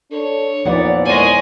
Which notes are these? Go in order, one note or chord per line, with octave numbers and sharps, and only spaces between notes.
D4 A4 C#5
E2 A#2 E3 F3 D#4 D5 F#5
G#3 C#5 G#5